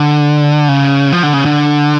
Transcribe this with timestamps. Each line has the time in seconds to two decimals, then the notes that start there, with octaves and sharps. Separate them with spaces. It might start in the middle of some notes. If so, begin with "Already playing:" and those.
Already playing: D3
0.69 C#3
1.12 F3
1.23 D3
1.34 C#3
1.45 D3